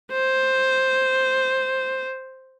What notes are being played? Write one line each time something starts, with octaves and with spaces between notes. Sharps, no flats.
C5